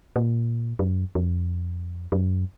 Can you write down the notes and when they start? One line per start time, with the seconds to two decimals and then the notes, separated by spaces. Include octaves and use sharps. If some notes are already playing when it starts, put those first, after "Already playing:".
0.16 A#2
0.79 F#2
1.15 F2
2.12 F#2